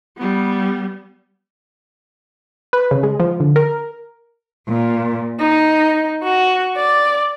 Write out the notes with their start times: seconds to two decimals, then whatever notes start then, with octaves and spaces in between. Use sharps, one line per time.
0.17 G3 B3
2.73 B4
2.91 C#3
3.03 G#3
3.20 F3
3.40 D3
3.56 A#4
4.68 A#2
5.39 D#4
6.23 F#4
6.75 D5